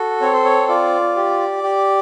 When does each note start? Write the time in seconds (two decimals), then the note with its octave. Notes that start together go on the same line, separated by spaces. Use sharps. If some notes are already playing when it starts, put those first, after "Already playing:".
Already playing: F#4 A4
0.21 C4 C#5
0.33 C5
0.44 C#5
0.68 F4 D5
1.16 G4
1.63 G4